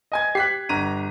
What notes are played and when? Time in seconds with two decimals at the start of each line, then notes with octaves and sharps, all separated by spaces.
0.12 D#5 G#5 G#6
0.35 G4 F#6 B6 C7
0.69 G1 A#5 D#7